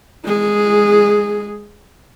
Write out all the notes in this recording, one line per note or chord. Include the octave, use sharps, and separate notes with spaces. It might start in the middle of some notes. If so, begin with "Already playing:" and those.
G#3 G#4